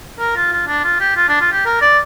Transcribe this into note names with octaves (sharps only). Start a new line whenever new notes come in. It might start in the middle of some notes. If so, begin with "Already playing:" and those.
A#4
F4
F4
D4
F4
G4
F4
D4
F4
G4
A#4
D5